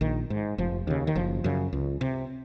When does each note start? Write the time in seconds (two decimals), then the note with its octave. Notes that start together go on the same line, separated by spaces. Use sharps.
0.01 A#1 D#3
0.30 G#2
0.58 F1 F3
0.87 D#2 C#3
1.07 D#3
1.15 F#1 F3
1.44 F#2 C#3
1.73 C#2
2.01 C3